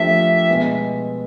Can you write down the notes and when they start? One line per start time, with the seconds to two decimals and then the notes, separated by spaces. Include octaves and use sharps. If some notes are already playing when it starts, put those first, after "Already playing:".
Already playing: F3 A3 D4 G4 A#4 E5
0.49 B2 G#3 B3